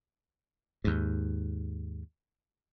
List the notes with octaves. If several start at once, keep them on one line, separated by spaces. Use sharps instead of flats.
D#2 G#2